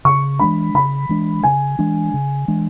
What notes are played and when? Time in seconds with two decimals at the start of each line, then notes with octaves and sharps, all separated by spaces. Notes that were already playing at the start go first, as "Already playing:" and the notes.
0.05 C#3 C#6
0.39 E3 G#3 D4 B5
0.74 C#3 B5
1.09 E3 G#3 D4
1.43 C#3 G#5
1.79 E3 G#3 D4
2.14 C#3
2.48 E3 G#3 D4